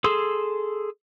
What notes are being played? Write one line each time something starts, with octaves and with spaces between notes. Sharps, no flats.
G#4 A4 C6 E6